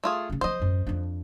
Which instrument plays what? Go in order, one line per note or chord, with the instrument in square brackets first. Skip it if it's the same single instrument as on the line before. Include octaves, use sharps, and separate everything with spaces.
[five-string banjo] A3 F4 G#4
[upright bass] C#3 C#4
[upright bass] F3 C4 [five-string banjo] C5 D#5
[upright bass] A1 F#2
F2 D4